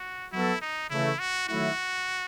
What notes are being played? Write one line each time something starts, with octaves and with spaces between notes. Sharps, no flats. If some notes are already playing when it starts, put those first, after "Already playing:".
Already playing: F#4
F#3 B3 E4 F#4 A4
D#4
C#3 E3 A3 E4
F#4
D#3 F#3 A3 E4 F#4